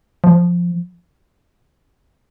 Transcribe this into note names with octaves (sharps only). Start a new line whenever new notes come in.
F3